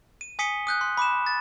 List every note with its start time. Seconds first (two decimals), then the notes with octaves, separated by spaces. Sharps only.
0.21 D#7
0.39 G#5 D#6 B6 C#7 D#7 G7
0.67 D#6 F#6 G6
0.81 C6
0.97 B5 D6 F#6 E7
1.27 A6